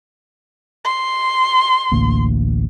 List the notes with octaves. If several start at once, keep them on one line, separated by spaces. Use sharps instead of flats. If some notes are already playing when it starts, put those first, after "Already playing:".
C6
A1 D2 A#3